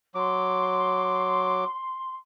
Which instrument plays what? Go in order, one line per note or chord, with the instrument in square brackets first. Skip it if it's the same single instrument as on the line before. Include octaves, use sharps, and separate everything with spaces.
[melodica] F#3 D6 [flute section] C6